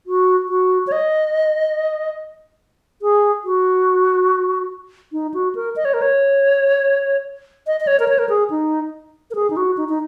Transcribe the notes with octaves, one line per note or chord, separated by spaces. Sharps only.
F#4
F#4
C#5
D#5
G#4
F#4
D#4
F#4
A#4
D#5
C#5
A#4
C#5
D#5
D#5
C#5
A#4
C#5
A#4
G#4
D#4
A#4
G#4
D#4
F#4
D#4
D#4